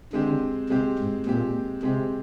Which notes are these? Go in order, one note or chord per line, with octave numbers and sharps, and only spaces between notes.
D3 G#3 C4 G4
C3 G#3 C4 G4
G#2
A#2 G#3 C4 G4
C3 G#3 C4 G4